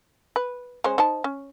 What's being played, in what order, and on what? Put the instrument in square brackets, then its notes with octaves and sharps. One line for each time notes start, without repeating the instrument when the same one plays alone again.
[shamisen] B4
G#3 C#4 C5
D#4 C5 A5
C#4